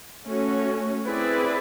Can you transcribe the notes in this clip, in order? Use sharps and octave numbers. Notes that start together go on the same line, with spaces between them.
A3 C#4 F#4
C4 E4 G#4 B4 D5